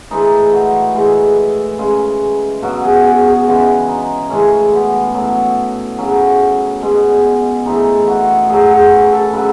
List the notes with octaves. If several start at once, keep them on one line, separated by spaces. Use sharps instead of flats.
A2 E3 G#3 D#4
F#4
A2 E3 G#3
C#3 G#3
B2 F#3 F#4
G#4
G#4
G#4
C#3 E3 G#3 F#4
D#4
A2 E3 G#3 C#4
B3
A2 F#3
C#3 F#3 C#4
B2 G#3
A2 E3 G#3 D#4
F#4
A2 F#3 G#4
G#4
B4
A4
C#3 F#3 B4